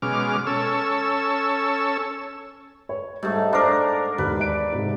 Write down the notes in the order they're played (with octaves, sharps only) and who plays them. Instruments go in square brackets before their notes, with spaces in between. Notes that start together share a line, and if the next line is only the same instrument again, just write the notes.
[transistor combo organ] B2 G#3 C#4 D6 F6
C#4 A4 C#5 E6
[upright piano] C#5
[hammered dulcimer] G#2 A3 [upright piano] G3
[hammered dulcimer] D4 A#4 [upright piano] C5 D5 A#5
[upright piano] E1 D#2 [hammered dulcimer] B4
[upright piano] D5 D7
G#2 C3